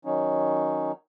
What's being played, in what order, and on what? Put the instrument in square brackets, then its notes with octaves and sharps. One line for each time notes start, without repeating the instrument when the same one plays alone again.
[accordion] D#3 F#3 C#4 D#4